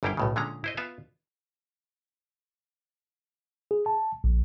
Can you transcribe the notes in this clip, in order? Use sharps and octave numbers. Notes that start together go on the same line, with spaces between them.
G1 F#2 G3 E4 F5 G5
B1 A2 C#3
A#2 D3 G#3 C#4 A#5
E4 C5 D#5
B3 F4 E5 F5
G#4
A5
A#1